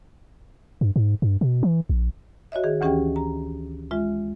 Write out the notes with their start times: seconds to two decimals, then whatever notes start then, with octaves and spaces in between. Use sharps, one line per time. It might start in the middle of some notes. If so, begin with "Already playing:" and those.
0.81 G2
0.96 G#2
1.22 G2
1.41 B2
1.63 E3
1.89 A#1
2.52 F#4 C#5 D#5 E5
2.64 D#3 G#4
2.81 D2 E3 C#4 G4 G#4 G5
3.16 A#5
3.91 G#3 F4 E5